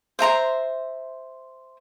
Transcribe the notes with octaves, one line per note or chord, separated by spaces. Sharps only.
C5 E5 A#5 C6